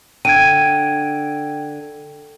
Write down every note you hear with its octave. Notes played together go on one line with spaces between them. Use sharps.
D3 G5 G#6 D7 D#7